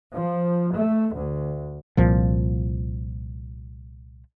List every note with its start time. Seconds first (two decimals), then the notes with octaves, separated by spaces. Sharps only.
0.14 F3
0.75 A3
1.15 D2
1.97 C2 A#2 F3